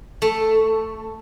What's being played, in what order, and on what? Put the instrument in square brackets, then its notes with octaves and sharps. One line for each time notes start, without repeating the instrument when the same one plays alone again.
[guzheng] A3